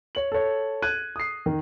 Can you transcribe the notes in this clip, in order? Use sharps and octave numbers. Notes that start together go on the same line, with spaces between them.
C#5 F#7
A4 C#5
F#6 G#6 D#7
D#6 C7
D#3